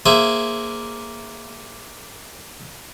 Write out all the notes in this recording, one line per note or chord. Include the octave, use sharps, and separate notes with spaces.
A#3 G#4 C5 E5